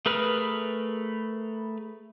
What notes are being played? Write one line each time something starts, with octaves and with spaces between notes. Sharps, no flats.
A3 G#4 A#4 B4 F6